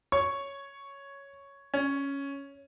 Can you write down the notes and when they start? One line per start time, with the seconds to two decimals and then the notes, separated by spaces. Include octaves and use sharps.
0.12 C#5 C#6
1.74 C#4